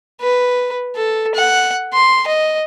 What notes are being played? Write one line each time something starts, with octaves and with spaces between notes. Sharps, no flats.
B4
A4
F#5
C6
D#5